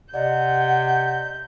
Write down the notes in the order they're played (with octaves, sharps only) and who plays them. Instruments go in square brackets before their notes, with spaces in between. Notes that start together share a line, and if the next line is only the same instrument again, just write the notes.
[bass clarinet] C3 [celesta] D5 D#5 [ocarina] F#5 [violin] G6